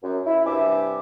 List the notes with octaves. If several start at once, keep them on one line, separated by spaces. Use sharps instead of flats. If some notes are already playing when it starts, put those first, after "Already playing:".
F#2
E4
G2 C3 E5 G#5 D6